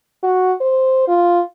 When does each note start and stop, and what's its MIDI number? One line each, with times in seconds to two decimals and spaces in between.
0.23 0.52 66
0.61 1.04 72
1.08 1.42 65